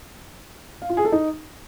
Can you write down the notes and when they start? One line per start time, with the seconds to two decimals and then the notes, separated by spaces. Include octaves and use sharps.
0.82 F5
0.89 F4
0.97 G#4
1.05 A4
1.12 D#4